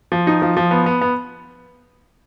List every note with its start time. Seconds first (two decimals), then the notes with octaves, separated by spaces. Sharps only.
0.12 F3
0.27 D#4
0.42 F3
0.57 F3
0.71 B3
0.86 B3
1.01 B3